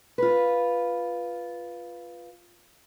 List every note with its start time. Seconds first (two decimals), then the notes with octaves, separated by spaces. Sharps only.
0.18 F4 B4